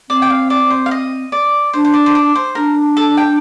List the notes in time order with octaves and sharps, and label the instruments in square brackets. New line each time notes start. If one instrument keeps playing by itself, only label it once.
[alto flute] C4 [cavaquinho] D5
[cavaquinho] G5
F5
D5
C5
F5
D#5
D5
[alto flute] D4 [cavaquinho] C5
[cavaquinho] C5
D5
C5
D5
C5
[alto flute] D4 [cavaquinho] A#4
[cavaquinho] A4
G5